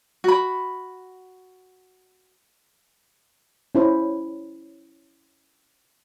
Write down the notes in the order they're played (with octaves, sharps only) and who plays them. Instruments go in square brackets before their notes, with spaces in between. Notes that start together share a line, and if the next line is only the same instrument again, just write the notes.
[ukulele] F#4 B5
[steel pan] C#4 E4 C5